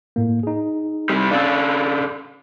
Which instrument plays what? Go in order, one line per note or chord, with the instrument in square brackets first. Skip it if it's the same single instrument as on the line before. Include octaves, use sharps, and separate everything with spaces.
[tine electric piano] A2 A#3
D#4 G#4
[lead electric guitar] C3 G3
[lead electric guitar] C#3 D4 [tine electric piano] F5 E6